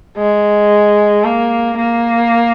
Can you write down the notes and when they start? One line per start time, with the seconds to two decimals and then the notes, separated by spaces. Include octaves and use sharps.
0.17 G#3
1.24 A#3
1.78 A#3